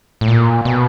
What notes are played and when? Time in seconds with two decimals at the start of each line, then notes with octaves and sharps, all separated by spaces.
0.21 A2
0.28 A#2
0.65 B2